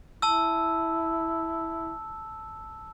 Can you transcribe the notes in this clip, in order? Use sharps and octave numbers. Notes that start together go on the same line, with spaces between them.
E4 A5 E6